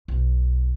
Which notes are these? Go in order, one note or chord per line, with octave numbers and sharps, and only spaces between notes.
B1